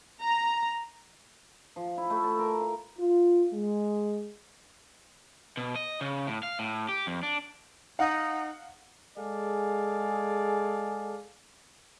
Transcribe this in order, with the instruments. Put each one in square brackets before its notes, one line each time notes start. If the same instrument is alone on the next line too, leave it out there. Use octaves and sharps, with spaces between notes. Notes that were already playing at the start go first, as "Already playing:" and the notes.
[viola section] A#5
[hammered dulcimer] F3
E4
A3
A5
A#4
F5
[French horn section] F4
G#3
[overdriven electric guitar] B2
D#5
C#3
A2
F5
A2
G4
F2
D4
[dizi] D#4 [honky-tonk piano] F5 F#5
[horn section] G#3 G#4 A4 D5 F5